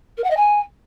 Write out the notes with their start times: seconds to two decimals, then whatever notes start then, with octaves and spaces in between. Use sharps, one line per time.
0.18 A#4
0.24 F#5
0.30 D#5
0.37 G#5